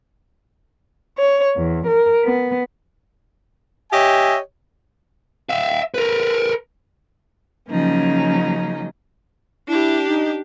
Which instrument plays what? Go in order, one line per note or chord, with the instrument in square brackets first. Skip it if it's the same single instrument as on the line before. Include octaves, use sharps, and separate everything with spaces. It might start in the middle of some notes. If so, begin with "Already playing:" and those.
[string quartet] C#5
E2
A#4
B3
[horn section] G4 C#5 D#5 E5 G#5
[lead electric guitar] E5 F5
A#4 B4
[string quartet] C#3 F3 F#3 A#3 C#4 D#4
[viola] D4 G4 [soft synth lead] E4
[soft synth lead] D#4